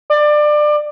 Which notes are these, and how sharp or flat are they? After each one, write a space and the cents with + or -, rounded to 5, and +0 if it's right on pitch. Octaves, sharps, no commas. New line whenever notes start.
D5 +25